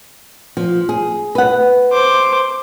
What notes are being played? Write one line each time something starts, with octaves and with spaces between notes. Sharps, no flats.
F3
G#4
B4 F#5
C5 D6